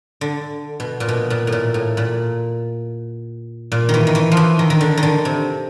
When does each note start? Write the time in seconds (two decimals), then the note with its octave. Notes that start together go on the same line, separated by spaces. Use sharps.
0.21 D3
0.80 B2
1.00 A#2
1.09 B2
1.30 A#2
1.47 A2
1.52 A#2
1.74 A2
1.97 A#2
3.72 A#2
3.89 D#3
3.94 E3
4.07 D#3
4.15 E3
4.32 F3
4.37 E3
4.59 D#3
4.70 D#3
4.81 D3
4.97 D#3
5.03 D3
5.25 C3